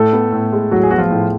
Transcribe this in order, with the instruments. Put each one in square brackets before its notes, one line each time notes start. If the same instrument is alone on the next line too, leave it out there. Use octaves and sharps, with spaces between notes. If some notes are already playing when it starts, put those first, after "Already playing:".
Already playing: [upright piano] A2 [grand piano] A3 A4
[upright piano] B3
A2
G#3
[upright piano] A2 [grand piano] F#3 F#4
[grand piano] G#4
[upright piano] B3 [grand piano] F#4
[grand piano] F3 F4
[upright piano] A2